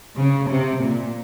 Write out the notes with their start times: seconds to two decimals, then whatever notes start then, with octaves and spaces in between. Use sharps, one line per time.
0.17 C#3
0.50 C3
0.83 A#2